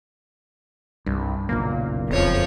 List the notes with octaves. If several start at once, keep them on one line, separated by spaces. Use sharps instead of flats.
C2 G2
F#1 B1 A#2 A#3
E1 F2 F3 C#5